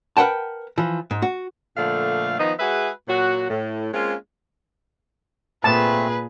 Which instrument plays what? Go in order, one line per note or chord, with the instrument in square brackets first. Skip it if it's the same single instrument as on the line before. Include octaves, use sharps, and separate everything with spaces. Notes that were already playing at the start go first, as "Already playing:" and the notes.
[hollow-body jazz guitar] A#4 B4 F#5 G5 A5
E3 F3
G#2
F#4
[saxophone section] A#2 D3 F3 A3 F5
D#3 F3 B3 D#4
G#3 F#4 G#4 B4 E5
A#2 F#3 F#4
A2
G#3 A#3 C4 C#4 F4
[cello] A#2 G#4 [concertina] A3 C4 [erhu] B4 [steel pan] A5